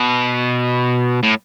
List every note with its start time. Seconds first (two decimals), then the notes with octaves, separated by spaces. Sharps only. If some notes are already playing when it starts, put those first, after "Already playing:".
Already playing: B2
1.23 A2